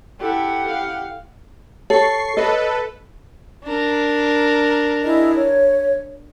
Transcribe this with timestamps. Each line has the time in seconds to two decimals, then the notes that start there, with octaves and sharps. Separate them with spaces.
0.19 E4 G4 A4 F#5
0.67 F5
1.90 A4 C#5 C#6 C7
2.37 A4 B4 D#5
3.64 D4 A#4
5.03 E4 G#4 D#5
5.34 C#5